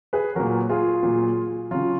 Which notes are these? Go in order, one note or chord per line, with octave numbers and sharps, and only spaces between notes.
G#4 B4
A#2 F#3 F#4 A#4
F4 G#4
A#2 F#3
C#3 F#3 F4